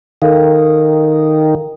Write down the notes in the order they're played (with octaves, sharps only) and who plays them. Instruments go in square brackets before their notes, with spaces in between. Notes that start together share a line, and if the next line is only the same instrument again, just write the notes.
[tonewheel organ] D#3 [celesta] A4 A#4 F5